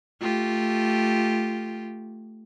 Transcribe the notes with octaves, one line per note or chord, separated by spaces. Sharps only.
A3 F4 G4